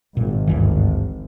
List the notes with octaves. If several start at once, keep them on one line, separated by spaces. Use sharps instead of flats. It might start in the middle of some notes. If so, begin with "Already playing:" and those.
G#1 A#2
D2 G2 E3